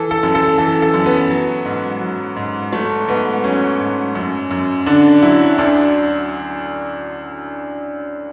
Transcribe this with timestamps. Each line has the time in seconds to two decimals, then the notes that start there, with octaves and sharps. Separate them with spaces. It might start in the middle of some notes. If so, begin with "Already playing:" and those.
Already playing: E3 A4
0.11 A4
0.23 F#2
0.35 A4
0.58 E3 A4
0.82 A4
0.94 F#2
1.06 B3
1.30 F#3
1.65 G#2
2.01 F#3
2.36 G#2
2.73 F#3 A3
3.08 G#2 B3
3.44 F#3 C#4
3.80 G#2
4.15 F#2
4.51 F#2
4.86 D3 D4
5.22 F#3 E4
5.58 D2 D4